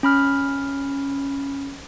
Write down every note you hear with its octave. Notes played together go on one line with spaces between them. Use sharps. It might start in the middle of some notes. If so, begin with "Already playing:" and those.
C#4 B5 F6